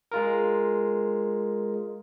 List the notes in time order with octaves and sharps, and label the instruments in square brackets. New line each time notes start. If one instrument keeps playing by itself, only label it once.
[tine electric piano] G#3 F4 A#4